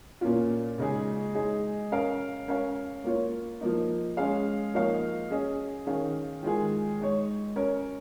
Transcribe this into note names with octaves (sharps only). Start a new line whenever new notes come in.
A#2 A#3 C#4 F4
C#3 G#3 D#4 G#4
G#3 D#4 G#4
C#4 A#4 F5
C#4 A#4 C#5 F5
A#3 F4 C#5
F3 A#3 D#4
G#3 C#4 G#4 F5
F3 A#3 D#4 C#5 F5
C#4 G#4 D#5
D#3 C#4 G#4 F5
D#3 G#3 F4 G#4
G#3 D#4 C#5
C#4 A#4 C#5